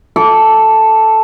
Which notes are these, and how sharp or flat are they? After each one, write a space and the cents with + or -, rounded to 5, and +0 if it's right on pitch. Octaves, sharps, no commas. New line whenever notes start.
A4 +0 D6 -20